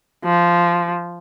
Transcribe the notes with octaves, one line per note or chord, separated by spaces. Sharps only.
F3